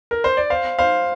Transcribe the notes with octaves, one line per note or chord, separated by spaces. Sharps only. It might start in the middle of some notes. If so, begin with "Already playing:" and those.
A#4
C5
D5
C5 F5
C5 F5